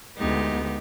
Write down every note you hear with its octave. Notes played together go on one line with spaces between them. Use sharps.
D2 G#3 B3 D#4 G4